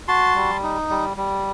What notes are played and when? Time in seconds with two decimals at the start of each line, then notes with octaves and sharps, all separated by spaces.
0.08 F#4 A5 C6
0.35 G3
0.63 D#4
0.90 G3
1.17 G3